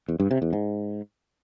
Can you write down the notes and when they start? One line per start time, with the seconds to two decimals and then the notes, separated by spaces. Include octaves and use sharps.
0.09 E2
0.20 G2
0.31 C3
0.42 E2
0.53 G#2